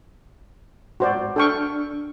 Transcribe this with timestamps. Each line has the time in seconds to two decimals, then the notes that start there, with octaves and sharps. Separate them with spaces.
1.00 G#2 F#4 C5 D5
1.36 D4 A4 G5 C#6 F6